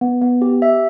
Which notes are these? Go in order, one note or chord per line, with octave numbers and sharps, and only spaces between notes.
B3
B3
G4
E5